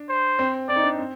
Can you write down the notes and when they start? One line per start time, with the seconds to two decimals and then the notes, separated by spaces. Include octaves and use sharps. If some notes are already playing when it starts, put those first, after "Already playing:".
Already playing: D4
0.09 C5
0.39 C4
0.69 C4 D5
0.76 D#4
0.83 D4
0.98 C4